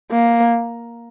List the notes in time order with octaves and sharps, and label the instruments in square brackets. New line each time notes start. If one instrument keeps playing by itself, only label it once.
[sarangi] A#3